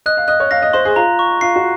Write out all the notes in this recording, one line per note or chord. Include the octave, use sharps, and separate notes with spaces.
D#5 F#6
F5
D#5 F#6
C#5
F5 A#6
D#5
C5 C6
G#4
F4 A#5
C#6
F4 C7
F#4